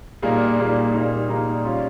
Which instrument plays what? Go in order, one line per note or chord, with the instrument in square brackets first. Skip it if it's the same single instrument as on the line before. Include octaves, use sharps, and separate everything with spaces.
[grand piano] A#2 G3 A#3 D#4 G#4
A#2 G3 A#3 D#4 G#4
A#2 G3 A#3 D#4 G#4
A#2 G3 A#3 D#4 G#4
G3 C#4 F4